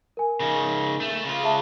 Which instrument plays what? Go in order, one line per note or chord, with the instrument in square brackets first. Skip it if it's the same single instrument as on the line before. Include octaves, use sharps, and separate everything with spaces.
[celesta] A#4 G#5
[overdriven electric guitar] C#3 D#4
A3
C#3 F4
[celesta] G#4 E5 A5